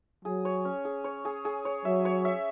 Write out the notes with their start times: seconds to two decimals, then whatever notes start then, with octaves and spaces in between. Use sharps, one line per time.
0.25 F#3 G#4
0.45 C#5
0.65 C#4
0.85 G#4
1.04 C#5
1.25 G#4
1.45 G#4
1.65 C#5
1.85 F#3 E5
2.05 C#5
2.25 E5